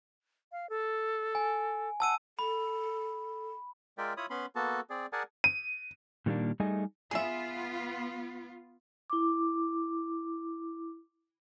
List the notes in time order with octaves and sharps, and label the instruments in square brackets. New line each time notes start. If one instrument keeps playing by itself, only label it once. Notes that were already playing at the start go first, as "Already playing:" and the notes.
[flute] F5
A4
[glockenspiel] G#5
[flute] F#5 [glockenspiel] A5 E6 D#7
[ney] A4 [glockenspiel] B5
[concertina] G#3 F4 A#4 D5 E5 G5
E4 F4 C#5 B5 D#6
B3 C#4 B5 C6
A#3 B3 F#4 A4 A5
C4 G#4 D5
G#4 A#4 D5 F#5 G#5 A5
[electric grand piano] D#7
[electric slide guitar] A#2 D#3 G3 A3 A#3 D4
G3 A3 D#4 G#4 D#5 G#5
[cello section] B3 F4 [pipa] G#4 E5
[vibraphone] E4 D6